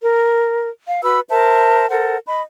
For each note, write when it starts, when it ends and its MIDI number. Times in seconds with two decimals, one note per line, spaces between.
0.01 0.68 70
0.86 1.01 77
1.03 1.20 66
1.03 1.20 71
1.03 1.20 83
1.03 1.20 88
1.30 1.88 70
1.30 1.88 72
1.30 1.88 76
1.30 1.88 81
1.90 2.18 69
1.90 2.18 70
1.90 2.18 72
1.90 2.18 78
2.27 2.41 75
2.27 2.41 83